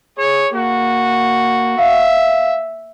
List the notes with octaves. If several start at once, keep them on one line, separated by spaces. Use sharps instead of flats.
G#4 C#5
A#3 F#4
E5 F5